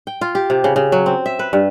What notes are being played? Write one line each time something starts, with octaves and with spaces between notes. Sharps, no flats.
G5
F4
G4
C3
C#3
C#3
F#3
C4
E5
B4
G2